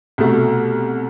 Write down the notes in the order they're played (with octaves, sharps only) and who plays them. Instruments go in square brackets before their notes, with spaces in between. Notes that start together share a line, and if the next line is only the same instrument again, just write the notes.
[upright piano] C2 B2 A3